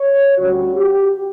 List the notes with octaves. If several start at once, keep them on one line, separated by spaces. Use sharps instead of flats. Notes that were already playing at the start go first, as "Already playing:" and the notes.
Already playing: C#5
D2 D3 G3 C#4 F#4
G4